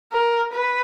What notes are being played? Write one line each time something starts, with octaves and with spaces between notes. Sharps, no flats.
A#4
B4